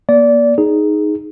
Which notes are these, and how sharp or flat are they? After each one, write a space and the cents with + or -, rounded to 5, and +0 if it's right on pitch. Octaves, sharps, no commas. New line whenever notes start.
A#3 +35 D5 -20
D#4 +0 G#4 +5